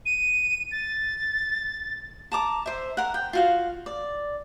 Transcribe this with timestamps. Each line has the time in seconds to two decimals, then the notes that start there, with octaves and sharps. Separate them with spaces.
0.06 D#7
0.72 A6
2.32 A5 A#5 D6
2.66 C5 E5
2.97 A#4 F#5
3.14 G5
3.33 F4 F#4 F5
3.86 D5